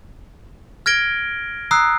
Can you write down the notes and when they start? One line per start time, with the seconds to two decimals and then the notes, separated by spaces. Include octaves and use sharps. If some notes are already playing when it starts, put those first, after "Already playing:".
0.86 F6 G#6 A#6 D7 G7
1.71 A#5 D#6 E6 F#6 C7